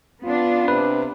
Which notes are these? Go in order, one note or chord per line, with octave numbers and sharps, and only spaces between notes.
B3 D4 F4
C3 B4